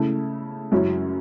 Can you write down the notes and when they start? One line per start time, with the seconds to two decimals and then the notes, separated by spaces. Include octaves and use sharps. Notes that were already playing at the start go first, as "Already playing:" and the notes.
Already playing: C#3 A3 E4
0.72 F#2 C#3 F#3 C#4 E4